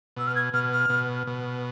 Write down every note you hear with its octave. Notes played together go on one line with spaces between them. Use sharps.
B2 E6
F6
G#6
B2 F6
F6
B2
B2